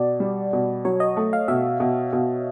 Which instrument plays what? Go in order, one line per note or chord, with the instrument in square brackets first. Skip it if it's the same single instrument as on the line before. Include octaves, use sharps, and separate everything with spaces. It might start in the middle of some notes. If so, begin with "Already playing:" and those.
Already playing: [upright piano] B2 [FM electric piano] D5
[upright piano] G3
B2
[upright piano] F#3 [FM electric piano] C#5
[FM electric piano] D#5
[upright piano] A3
[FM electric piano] F5
[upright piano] B2 [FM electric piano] E5
[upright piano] B2
B2